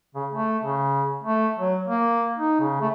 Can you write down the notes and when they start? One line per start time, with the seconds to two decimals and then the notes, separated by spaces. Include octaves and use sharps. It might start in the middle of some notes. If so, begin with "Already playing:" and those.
0.15 C#3
0.34 A3
0.63 C#3
1.23 A3
1.59 F#3
1.87 A#3
2.38 D#4
2.60 C#3
2.81 A3